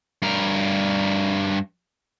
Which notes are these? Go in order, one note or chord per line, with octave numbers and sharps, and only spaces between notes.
G2 A#4